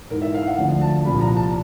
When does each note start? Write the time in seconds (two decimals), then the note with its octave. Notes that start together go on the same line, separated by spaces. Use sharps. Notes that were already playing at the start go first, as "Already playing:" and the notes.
0.10 G#2 E3 A#4
0.22 E5
0.34 F5
0.47 F#5
0.58 D2 D3 F3
0.82 A5
1.05 C2 A#2 F3 B5
1.21 A#5
1.37 A5